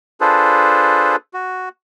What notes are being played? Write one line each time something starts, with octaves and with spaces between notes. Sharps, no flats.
D4 F4 G#4 A4 B4 C5
F#4